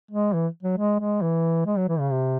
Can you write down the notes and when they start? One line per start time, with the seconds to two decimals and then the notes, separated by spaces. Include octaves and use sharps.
0.11 G#3
0.34 E3
0.63 F#3
0.78 G#3
1.00 G#3
1.22 E3
1.67 G#3
1.78 F#3
1.89 E3
2.00 C#3
2.11 C3